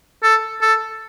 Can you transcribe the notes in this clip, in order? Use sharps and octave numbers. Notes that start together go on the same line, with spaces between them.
A4
A4